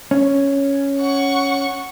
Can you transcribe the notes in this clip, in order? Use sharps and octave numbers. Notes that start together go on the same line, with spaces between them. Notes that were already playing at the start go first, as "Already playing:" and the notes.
C#4
F#5 C#6